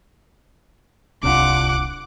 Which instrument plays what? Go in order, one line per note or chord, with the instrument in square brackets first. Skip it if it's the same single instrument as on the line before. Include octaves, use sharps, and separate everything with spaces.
[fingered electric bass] D1 C2 [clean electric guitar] C3 D4 F4 [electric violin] F#5 D6